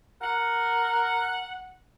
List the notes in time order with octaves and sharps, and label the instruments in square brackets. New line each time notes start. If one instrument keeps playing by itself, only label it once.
[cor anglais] A#4 [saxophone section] F#5